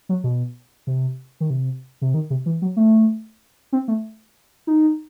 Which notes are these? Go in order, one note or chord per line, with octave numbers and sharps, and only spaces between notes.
F#3
B2
C3
D#3
C3
C3
D#3
C3
E3
F#3
A3
C4
A3
D#4